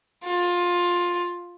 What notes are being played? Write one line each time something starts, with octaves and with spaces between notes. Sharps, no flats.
F4